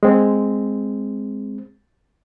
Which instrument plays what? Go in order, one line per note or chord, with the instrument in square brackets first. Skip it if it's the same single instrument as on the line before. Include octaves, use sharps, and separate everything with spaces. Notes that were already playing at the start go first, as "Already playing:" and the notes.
[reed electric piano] G#3 C4